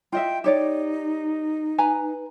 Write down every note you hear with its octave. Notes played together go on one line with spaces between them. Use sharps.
F4 D#5 E5 G5
D#4 G4 C#5 D5
B4 G#5 A#5